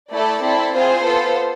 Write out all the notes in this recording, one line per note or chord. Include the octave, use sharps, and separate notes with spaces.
A3 E4 A4 D5
C4 E4 A4
C4 F4 G#4 C5
B3 F4 A4